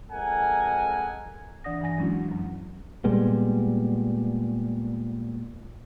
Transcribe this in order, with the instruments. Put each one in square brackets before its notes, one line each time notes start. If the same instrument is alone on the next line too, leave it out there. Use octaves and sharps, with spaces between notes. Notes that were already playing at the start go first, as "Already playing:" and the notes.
[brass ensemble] F2 G#3 A4 A#4 F#5 G#5
[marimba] E3 D4 D5 F#5 D#6 A#6
G2 E3 G#5 A#6
F#3 G#3 C#4 D4 E4 F#4
F#2 F#3
[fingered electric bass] A#2 G3 G#3 B3